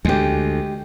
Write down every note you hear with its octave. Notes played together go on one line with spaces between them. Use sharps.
D2 G#3 G4